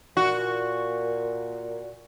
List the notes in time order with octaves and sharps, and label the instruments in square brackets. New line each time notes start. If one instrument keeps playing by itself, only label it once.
[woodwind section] A#2 [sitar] F#4